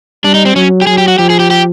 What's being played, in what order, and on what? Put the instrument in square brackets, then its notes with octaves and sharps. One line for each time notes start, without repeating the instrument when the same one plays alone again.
[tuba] G3 [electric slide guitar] D4
[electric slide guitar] D#4
C4
[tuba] F#3 [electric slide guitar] C#4
[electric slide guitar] G4
[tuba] F#3 [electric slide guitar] G#4
[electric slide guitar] G4
F#4
[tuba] F3 [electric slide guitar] G4
[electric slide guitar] G#4
G4
G4